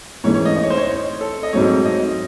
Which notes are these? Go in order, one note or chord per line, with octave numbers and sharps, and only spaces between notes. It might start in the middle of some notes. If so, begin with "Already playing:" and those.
G#2 E3 A3 C#4 C#5
C#5
D#5
D#5
C#5
C5
C#5
A4
D#5
G#2 F#3 A3 C4 C#5
D#5